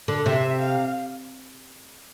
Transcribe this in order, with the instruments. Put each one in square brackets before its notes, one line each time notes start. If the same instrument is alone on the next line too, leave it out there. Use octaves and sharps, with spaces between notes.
[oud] D3
[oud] C3 [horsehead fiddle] E5
[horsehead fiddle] F5